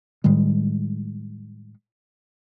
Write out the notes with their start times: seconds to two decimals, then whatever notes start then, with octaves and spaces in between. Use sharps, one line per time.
0.24 A2 D#3 G3 G#3